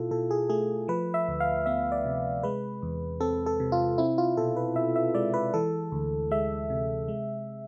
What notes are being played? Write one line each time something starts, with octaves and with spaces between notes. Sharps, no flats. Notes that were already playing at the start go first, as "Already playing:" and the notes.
Already playing: B2 E4 F4 A4
B2 A4
G#4
A3 G#4
F3 B4
E5
D2
F5
B3 E5
D5
C3
G#3 B4
E2
C4 A4
A4
C3
F4
C4 E4
F4
B2 A4
B4
B2 E5
E5
G#3 D5
B4
E3 A4
D2
G#3 E5
C3
G#3